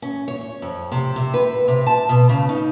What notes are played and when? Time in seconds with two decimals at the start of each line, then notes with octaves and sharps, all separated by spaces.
0.02 C#4
0.28 C#5
0.62 F2
0.92 C3
1.16 C3
1.34 B4
1.68 C3
1.87 A5
2.09 B2
2.29 C#3
2.49 D#4